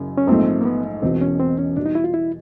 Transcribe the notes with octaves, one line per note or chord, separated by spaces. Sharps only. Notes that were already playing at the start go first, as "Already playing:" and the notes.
Already playing: F#1 F#2 C#3
C#4
A#1 G#2 F3 A3 C4
A#3
B3
E1 E2 B2 C4
C#4
C4
C#4
E2 B2 G3 D4
D#4
E4
F4
E4